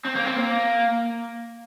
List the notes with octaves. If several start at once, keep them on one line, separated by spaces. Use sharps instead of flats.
C4
A#3
C4
A#3